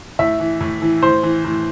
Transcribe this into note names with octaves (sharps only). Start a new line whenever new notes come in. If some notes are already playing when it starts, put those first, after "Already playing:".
A2 E5
E3
A2
E3
A2 C5
E3
A2